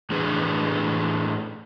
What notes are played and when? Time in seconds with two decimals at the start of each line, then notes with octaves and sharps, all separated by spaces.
0.10 A2 E3 D4 G#4 B4